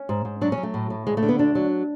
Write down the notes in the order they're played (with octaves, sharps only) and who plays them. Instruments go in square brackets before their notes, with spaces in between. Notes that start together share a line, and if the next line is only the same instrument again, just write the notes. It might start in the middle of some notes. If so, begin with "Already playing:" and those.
Already playing: [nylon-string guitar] C#4
G#2
G#2
F#3 D4
C#4
F#3
A3
A2
A2
D2 G#3
A3
D3
B3
D2 D4
F#3